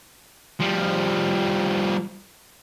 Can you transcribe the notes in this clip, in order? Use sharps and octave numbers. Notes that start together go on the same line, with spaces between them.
F3 G3